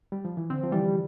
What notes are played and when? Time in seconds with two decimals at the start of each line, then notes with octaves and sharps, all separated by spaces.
0.12 G3
0.25 F3
0.37 E3
0.50 D3 C4
0.64 F3
0.72 E3 G3